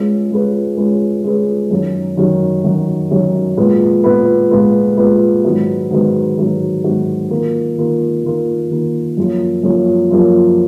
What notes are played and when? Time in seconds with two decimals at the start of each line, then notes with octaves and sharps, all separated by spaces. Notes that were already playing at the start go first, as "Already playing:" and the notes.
Already playing: G#3 C#4 F4 G#4 B4
0.31 G#3 C#4 F4 G#4 B4
0.77 G#3 C#4 F4 G#4 B4
1.24 G#3 C#4 F4 G#4 B4
1.71 F#2 D#3 F#3 C#4 F#4
2.17 F#2 D#3 F#3 C#4 F#4
2.64 F#2 D#3 F#3 C#4 F#4
3.11 F#2 D#3 F#3 C#4 F#4
3.57 A#2 G#3 B3 F4 B4
4.04 A#2 G#3 B3 F4 B4
4.51 A#2 G#3 B3 F4 B4
4.97 A#2 G#3 B3 F4 B4
5.44 G#2 D#3 F#3 B3 F#4
5.91 G#2 D#3 F#3 B3 F#4
6.37 G#2 D#3 F#3 B3 F#4
6.84 G#2 D#3 F#3 B3 F#4
7.31 D#3 A#3 F4 A#4
7.77 D#3 A#3 F4 A#4
8.24 D#3 A#3 F4 A#4
8.71 D#3 A#3 F4 A#4
9.17 F#2 F3 A#3 C#4 F4
9.63 F#2 F3 A#3 C#4 F4
10.11 F#2 F3 A#3 C#4 F4